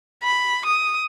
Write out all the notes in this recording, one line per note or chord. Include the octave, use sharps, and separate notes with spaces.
B5
D#6